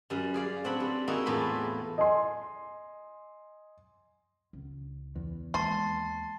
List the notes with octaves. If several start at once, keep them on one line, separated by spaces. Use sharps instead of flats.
F#2 G3
G#4 D5 F5
A2 C4 D4 F#5 B5
G3
A#3 D#4 E4 F#4 G#4
E2 A2 F4 B5
D#5 G#5 C6
C#2
E2
D#2 G#3 A5 C6 A6 C7